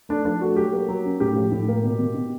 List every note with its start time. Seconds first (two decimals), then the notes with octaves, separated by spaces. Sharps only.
0.09 A3 D4
0.25 F3 D4
0.41 A3 F#4
0.56 F#3 G4
0.73 A#3
0.88 F#3
1.05 C#4
1.20 A2 G4
1.36 F3
1.51 A2
1.68 A#3
1.84 B2
1.99 B2
2.15 B2